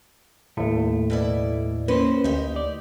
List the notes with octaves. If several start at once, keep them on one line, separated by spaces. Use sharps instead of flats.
D#2 A2 A3
B2 E4 D5
A#3 C#4 B4 C5
D2 D#4 G4
D5